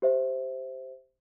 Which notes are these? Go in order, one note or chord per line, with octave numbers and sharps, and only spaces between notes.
G4 C5 E5